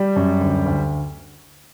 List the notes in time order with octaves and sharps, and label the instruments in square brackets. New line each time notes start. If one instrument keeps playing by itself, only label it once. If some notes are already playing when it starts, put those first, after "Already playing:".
Already playing: [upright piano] G3
[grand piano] F#2
D2
D2